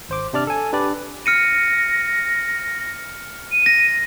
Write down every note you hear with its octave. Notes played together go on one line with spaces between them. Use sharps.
G#1 C5 D6
C3 D4 D5 F6
A4 G#5
D4 G4 B4 D5
F6 A#6 C#7 D#7
D#7
A#6